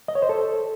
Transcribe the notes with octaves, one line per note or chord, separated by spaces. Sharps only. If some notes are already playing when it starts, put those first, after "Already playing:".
D#5
C#5
C5
A4